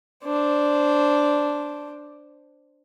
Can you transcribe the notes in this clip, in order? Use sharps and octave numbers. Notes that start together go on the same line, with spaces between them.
D4 C5